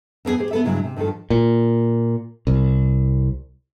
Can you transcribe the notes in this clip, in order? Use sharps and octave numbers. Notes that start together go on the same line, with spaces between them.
F2 B3 D#4 G#4 C5
G4 G#4 C5
B3 A4 E5
G2 C#3 F#3 G#3 E4
C3
G2 D#3 F3 A4
A#2
C2